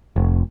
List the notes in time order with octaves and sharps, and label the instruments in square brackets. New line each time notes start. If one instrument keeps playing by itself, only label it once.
[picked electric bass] F1